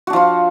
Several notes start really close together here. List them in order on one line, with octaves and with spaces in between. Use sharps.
F#4 D4 F3 F4